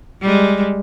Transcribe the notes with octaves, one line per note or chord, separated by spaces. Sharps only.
G3 G#3